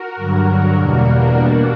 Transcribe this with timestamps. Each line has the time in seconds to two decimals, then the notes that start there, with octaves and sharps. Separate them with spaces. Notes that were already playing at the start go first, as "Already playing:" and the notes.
Already playing: F#4 A#4
0.16 G2 D3 F#3
0.77 E2 B2 G3 A#3 F#4 A#4
1.06 D4 F#4
1.38 B2 G3 A#3